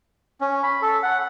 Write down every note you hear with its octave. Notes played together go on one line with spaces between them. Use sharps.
C#4
B5
A4
F#5